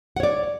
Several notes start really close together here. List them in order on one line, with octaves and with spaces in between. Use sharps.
F#5 C#5 D5